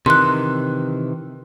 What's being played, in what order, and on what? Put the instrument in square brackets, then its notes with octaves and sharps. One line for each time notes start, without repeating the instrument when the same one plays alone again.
[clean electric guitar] C3 D#3 E3 [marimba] C6 F#6